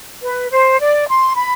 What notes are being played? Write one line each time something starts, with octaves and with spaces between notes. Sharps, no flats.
B4
C5
D5
C6
B5